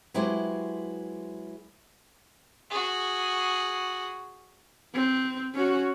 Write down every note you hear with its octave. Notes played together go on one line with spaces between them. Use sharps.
F#3 G#3 E4 G4 B4 C5
F#4 G#4
C4
C#4 F#4